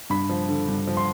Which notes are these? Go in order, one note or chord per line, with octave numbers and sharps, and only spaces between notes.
G2 B5
F3
D3
G2
F3
C6